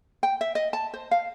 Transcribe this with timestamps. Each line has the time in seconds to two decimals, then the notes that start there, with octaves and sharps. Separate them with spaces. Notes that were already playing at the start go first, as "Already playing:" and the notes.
0.23 G5
0.41 E5
0.55 D#5
0.73 A5
0.94 C5
1.11 F5